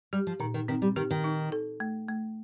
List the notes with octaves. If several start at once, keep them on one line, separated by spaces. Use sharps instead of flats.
G3 G4
F3
A#2 D#3
D#3
D#3 C4
G3
D#3 G4
D#3
D#4
A4
A3
A3